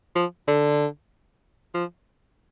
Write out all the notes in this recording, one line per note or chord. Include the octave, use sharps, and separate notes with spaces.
F3
D3
F3